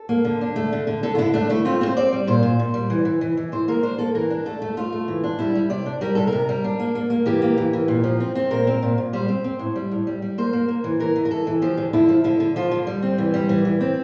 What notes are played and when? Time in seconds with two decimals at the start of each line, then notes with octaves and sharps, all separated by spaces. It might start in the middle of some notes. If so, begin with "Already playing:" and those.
Already playing: A4
0.09 A#3
0.25 D3
0.41 D4
0.56 A3
0.72 D3
0.87 D3
1.03 D3 A4
1.15 F4
1.18 D3 E4
1.34 A3 D4
1.50 A3 E4
1.65 C4 F4
1.81 C4
1.86 C5
1.97 C4 D5
2.12 G3
2.27 A#2 C5
2.43 A#2
2.59 A#2
2.74 G3
2.90 E3
3.05 E3
3.21 E3
3.37 E3
3.52 E3 C5
3.68 A#3 A#4
3.83 D4 C5
3.98 A#3 A4
4.15 E3 A#4
4.30 D4
4.46 A3 A4
4.62 A3
4.77 A3 F4
4.93 A3
5.08 E3
5.24 D4
5.39 G3 E4
5.55 G3
5.70 C3 D5
5.86 D4
6.01 G3 A#4
6.15 C3 A4
6.27 A#4
6.32 C3
6.49 G3
6.64 D4
6.80 A#3
6.95 A#3
7.10 A#3
7.26 E3 G4
7.42 A#3
7.58 E3
7.73 E3
7.88 A#2
8.04 F3
8.20 C4
8.35 C4
8.51 A#2 A#4
8.67 C4
8.83 A#2
8.98 A#2
9.13 G3 C5
9.29 C4
9.44 C4
9.59 A2
9.76 G3
9.91 A2
10.07 G3
10.22 G3
10.38 A#3 C5
10.53 A#3
10.68 A#3
10.84 E3
11.00 E3 A#4
11.16 E3
11.25 A#4
11.31 E3 A4
11.47 E3
11.62 F3 G4
11.77 D3
11.93 D3 E4
12.09 F3
12.24 D3 E4
12.40 D3
12.56 F3 F4
12.71 D3
12.87 G3
13.02 C4
13.18 E3
13.34 G3
13.49 E3
13.65 E3
13.80 C4